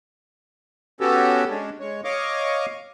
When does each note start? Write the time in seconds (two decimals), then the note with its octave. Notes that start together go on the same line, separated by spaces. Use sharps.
1.01 B3 C#4 F#4 G4 A4
1.50 G#3 C#4 D4
1.80 G#3 C#5
2.04 C#5 D#5 F5 C#6 D6